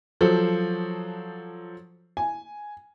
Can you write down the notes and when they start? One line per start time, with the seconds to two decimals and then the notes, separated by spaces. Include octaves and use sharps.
0.21 F3 F#3 A4 C5
2.17 G#5